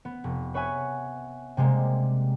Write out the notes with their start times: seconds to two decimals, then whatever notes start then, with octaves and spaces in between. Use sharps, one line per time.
0.05 B3
0.24 F1
0.54 B4 C#5 E5 F#5 G#5
1.57 C3 G3 G#3 A#3